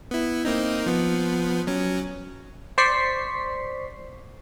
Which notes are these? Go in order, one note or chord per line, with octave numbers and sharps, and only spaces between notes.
B3 E4
A#3 C4 D#4
F3 B3
F#3 C#4
C5 D5 C#6 B6 C7